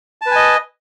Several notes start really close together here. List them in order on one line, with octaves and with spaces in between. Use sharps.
A5 B4 G#5 D#5